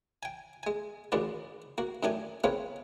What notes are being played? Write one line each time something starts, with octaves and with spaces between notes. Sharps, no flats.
G5 G#5
G#3 G#5
A1 D#2 A#2 G#3 F#4 D5
A#3 F#4
F#2 D#3 A3 D4 G4 G#5
G#3 A#3 C4 F4 B4 C#5